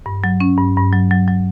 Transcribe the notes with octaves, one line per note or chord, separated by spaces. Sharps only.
G2
F#3
C#4
G2
G2
F#3
F#3
F#3